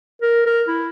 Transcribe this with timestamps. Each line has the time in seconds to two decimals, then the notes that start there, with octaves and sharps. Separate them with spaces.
0.22 A#4
0.46 A#4
0.68 E4